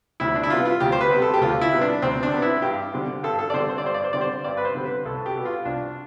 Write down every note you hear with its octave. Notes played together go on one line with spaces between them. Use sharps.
D2 E4
D4
E4
C3 G3 B3 F4
F4
D2 G4
C5
B4
C3 G3 B3
A4
G4
D2 F4
E4
C3 G3 B3
D4
D2 C4
D4
C3 G3 B3
E4
G2 G4
D3 G3 C4
G2 A4
A4
D5
D3 G3 C4 C5
C5
D5
G2 C5
D5
C5
D3 G3 C4 D5
C5
G2 D5
B4
C5
D3 G3 C4
B4
C2 A4
G4
B2 B3
F4
C2 D4